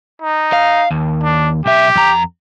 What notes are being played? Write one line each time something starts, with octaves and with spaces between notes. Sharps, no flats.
D#4
F5
D#2
D4
B1 G4 E5
F2 A#5